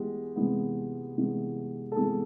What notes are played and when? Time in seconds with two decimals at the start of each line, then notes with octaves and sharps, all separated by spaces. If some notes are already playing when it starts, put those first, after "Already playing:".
Already playing: E3 G#3 B3 G4
0.36 C3 E3 G#3 B3
1.16 C3 E3 G#3 B3
1.92 A4
1.96 C3 E3 G#3 B3 G#4